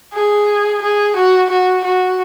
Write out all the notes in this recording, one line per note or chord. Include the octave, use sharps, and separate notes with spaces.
G#4
G#4
F#4
F#4
F#4